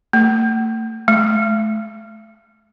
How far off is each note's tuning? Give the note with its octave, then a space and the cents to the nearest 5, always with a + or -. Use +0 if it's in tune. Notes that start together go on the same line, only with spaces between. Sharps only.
A3 +45
A3 -40